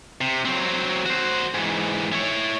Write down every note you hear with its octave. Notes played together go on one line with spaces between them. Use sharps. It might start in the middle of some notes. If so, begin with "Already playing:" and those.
C3
F#3 C4
F#4 C5
G#2 E3
E4 C#5